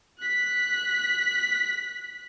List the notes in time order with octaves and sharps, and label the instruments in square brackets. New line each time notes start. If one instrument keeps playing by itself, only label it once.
[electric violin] F#6 B6